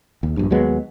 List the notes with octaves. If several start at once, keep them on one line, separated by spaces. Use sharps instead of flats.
D#2
A#1 G2
D#2 F#3 G#3 B3